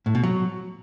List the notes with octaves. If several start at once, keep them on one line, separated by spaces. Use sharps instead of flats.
A2
B2
F#3